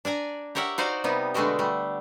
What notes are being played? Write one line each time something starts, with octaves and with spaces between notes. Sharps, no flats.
D4 D5 G#5 A#5
G4 A#4 C#5 E5 F#5
D#4 F#4 C5 D5 F5 F#5
C3 G3 B3 D#4
B2 D3 G#3 A3 F#4 G4
G3 A3